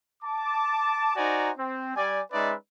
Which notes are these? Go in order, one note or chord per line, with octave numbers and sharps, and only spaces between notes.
A5 D6
D#4 F#4 C5 D5 G#5 A#5
C4
G3 D5 G#5
G#3 C#4 D#4 B4 D5 E5